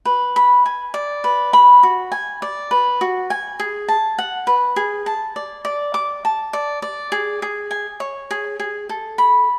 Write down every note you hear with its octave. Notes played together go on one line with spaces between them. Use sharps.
B4
B5
G#5
D5
B4
B5
F#4
G#5
D5
B4
F#4
G#5
G#4
A5
F#5
B4
G#4
A5
D5
D5
D6
A5
D5
D5
G#4
G#4
G#5
C#5
G#4
G#4
A4
B5